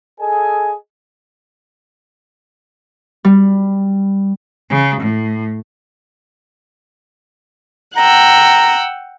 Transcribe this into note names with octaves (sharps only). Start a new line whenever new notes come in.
G#4 A4 D#5 G#5
G3
C#3
A2
F#5 G5 A#5 E6